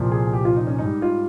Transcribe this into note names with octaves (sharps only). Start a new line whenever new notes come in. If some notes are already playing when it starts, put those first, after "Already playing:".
Already playing: C2 A#2 F3
G#4
G4
F4
D#4
C#4
G#2 G3 D#4
F4